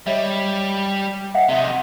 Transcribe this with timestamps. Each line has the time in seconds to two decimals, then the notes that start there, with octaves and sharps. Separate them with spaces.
0.06 G3 C#5 D#5 E5
1.34 D#5 E5 F#5
1.49 C3 D#4 E5